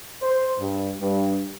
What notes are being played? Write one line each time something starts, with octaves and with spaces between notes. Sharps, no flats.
C5
G2
G2